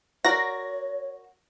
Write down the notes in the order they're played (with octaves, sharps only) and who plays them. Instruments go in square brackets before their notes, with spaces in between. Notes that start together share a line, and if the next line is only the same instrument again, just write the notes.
[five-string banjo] F#4 A#4 D5 [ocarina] C#5 [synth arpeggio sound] A#6